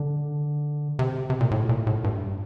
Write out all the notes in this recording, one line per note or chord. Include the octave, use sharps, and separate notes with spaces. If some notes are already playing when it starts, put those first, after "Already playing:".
Already playing: D3
C3
C3
A#2
A2
A#2
A2
G2